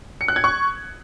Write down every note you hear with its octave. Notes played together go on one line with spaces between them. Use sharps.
C#7
F#6
G#6
C#6